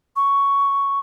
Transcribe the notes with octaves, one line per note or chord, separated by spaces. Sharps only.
C#6